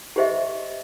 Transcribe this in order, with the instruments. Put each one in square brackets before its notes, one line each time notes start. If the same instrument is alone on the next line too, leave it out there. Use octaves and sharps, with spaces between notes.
[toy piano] G4 G#4 C5 D#5 E5